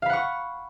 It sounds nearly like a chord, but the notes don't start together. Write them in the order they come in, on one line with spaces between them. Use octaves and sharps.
F5 B5 F#5 C#6